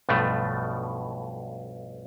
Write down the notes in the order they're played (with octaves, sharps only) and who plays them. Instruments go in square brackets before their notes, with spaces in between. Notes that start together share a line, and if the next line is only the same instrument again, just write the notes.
[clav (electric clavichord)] B1 G2 B2 F3 A3